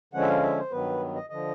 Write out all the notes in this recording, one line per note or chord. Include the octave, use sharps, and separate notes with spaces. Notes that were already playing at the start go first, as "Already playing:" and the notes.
D3 F3 G#3 C#4 F#5
E5
F5
E5
C5
G2 D#3 F#3 B3 B4
D#5
D3 F3 D#5